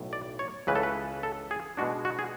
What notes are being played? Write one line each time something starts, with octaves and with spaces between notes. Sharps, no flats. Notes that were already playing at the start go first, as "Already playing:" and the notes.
Already playing: B1 A2
D5
C#5
C#2 C#3 E3 B4
A4
B4
A4
G#4
B2 G#3 D4 F#4
F#4
G#4